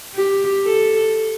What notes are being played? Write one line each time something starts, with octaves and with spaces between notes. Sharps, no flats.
G4
A4